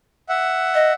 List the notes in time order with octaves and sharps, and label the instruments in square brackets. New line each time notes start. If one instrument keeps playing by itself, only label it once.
[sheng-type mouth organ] E5 F#5
[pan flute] D#5